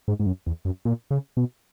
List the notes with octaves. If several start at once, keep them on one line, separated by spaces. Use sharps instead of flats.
G#2
G#2
F#2
E2
F#2
A#2
C#3
B2